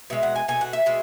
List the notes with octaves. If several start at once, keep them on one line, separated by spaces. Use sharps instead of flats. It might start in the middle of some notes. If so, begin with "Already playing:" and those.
B2 G#3 E5
F#5
G#5
B2 A3 G#5
F#5
E5
B2 G#3